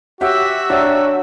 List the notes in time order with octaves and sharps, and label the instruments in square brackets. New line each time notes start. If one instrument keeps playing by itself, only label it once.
[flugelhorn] F#4 [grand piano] G4 [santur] C#5 F#5 E6 [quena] E5
[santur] F#3 G5 [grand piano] D4